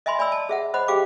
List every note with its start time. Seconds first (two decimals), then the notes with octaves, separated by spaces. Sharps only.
0.06 D#5 E5 G#5 B5 C6
0.19 D5 G#5 B5 E6
0.32 A5
0.49 G#4 E5 F#5
0.74 C5 D#5 F#5 B5
0.88 G4 G#4 F5 G5 D6